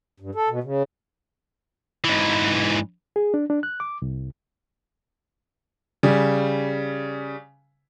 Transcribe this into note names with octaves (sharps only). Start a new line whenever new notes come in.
G2
A4
B2
C#3
G#2 E3
G#4
D4
D4
F#6
D6
C2
C#3 G3